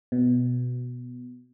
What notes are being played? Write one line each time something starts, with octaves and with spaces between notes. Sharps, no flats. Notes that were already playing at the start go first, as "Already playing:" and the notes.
B2